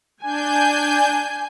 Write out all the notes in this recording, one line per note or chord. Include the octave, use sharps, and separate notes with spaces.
D4 G#5 G6